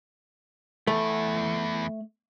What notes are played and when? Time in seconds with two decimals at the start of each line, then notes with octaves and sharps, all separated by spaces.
0.87 E2 E3 A3